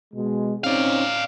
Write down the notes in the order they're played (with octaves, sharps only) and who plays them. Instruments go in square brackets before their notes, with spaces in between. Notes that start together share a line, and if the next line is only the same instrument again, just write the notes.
[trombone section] B2 G#3
[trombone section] C4 C#4 D#4 [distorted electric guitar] D5 F5